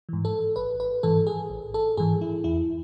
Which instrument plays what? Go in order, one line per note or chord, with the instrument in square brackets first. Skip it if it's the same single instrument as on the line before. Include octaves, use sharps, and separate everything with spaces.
[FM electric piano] G#2 E3
A4
A1 B4
B4
G#2 E3 A4
G#4
A1
A4
G#2 E3 G#4
E4
E2 E4